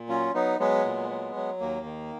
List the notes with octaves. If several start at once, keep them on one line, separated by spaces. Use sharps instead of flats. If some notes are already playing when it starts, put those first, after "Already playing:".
Already playing: A#2
F#3 C#4 F4
F#3 B3 D#4
F#3 G#3 B3
A#2
F#3
F#3
D#2 A#3
D#3